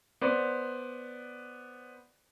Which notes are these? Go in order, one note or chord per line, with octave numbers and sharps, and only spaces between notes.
B3 C5 D5